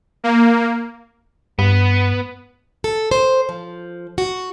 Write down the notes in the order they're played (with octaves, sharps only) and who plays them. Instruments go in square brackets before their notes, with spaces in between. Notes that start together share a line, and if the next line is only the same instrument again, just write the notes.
[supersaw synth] A#3
[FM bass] G2 [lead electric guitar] B3
[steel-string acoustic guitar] A4
C5
F3
F#4